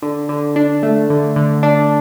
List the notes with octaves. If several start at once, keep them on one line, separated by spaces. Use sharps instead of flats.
D3
D3
D4
A3
D3
D3
D4